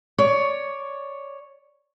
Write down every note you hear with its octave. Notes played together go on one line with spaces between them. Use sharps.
C#5 D5